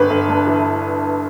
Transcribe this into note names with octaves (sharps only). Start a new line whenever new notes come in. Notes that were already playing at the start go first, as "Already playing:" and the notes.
Already playing: G1 B4
G1
G2
E3